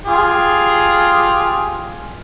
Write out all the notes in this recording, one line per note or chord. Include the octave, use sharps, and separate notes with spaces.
F4 G4 G#4